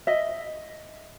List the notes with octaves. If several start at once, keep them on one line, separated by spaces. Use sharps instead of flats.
D#5 E5